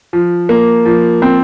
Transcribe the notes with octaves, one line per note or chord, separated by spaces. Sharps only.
F3
A#3
F3
C4